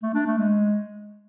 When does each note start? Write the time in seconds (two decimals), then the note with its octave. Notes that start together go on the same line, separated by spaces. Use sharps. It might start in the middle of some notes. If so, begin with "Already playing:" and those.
0.03 A3
0.15 D4
0.27 A3
0.39 G#3